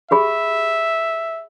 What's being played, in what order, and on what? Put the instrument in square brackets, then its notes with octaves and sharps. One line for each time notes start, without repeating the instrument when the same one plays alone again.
[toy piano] G4 G#4 B5 [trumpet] E5